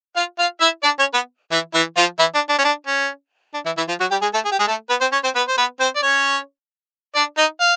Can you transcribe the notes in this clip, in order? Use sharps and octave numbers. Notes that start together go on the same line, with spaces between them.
F4 F5
F4 F5
E4 E5
D4 D5
C#4 C#5
B3 B4
E3 E4
E3 E4
F3 F4
E3 E4
D4
D4
C#4
D4
C#4
D4
E3 E4
E3 E4
F3 F4
F#3 F#4
G3 G4
G#3 G#4
A3 A4
G#4
G4
G#3 G#4
A3 A4
B3 B4
C4 C5
C#4 C#5
C4 C5
B3 B4
C5
B3 B4
C4 C5
D5
C#4 C#5
D4 D5
D#4 D#5
F5